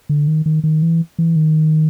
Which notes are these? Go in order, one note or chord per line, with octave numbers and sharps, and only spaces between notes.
D3
D#3
D#3
D#3
E3
E3
D#3